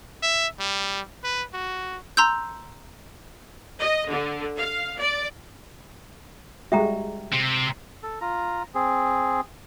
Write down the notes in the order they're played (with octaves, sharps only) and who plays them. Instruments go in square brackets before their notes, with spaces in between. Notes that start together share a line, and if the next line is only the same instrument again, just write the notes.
[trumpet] E5
G3
B4
F#4
[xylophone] A#5 C6 E6 G6
[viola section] D#5
D3
F5
D5
[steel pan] G3 G#3 F#4 [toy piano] E5 G5 A#5
[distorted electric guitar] C3 C4
[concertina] A4
F4 A#5
C4 G#4